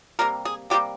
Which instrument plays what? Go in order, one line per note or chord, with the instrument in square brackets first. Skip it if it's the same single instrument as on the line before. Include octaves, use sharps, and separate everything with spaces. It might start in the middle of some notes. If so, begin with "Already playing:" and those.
[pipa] C3 G3 A#3 A#4
G#4
C3 G3 A#3 G4